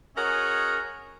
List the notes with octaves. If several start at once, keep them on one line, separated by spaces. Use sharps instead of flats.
C#4 F#4 G#4 A#4 C#5 D#5